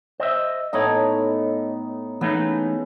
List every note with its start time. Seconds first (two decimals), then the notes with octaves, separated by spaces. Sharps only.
0.20 C5 D#5 E5
0.73 A2 B3 D#4 C#5 D#5
2.21 C#3 E3 A3 B3 D#4